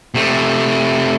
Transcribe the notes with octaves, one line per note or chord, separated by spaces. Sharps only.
C3 A3